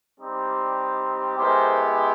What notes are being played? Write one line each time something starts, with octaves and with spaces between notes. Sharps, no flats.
G3 C4 D#4 G4
G#3 B3 E4 G4 A#4 C5